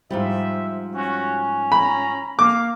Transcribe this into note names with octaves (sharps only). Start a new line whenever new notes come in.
G#2 F3 G3 E5
C#4 F#4
A#5 B5
A#3 F5 D6